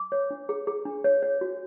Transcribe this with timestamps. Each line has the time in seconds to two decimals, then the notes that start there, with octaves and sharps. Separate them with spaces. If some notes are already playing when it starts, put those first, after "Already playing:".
Already playing: D6
0.12 C#5
0.31 D4
0.49 G#4
0.67 G#4
0.86 D4
1.04 C#5
1.22 C#5
1.41 F#4